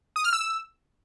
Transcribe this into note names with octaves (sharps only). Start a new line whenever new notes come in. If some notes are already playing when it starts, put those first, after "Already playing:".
D#6
F6
E6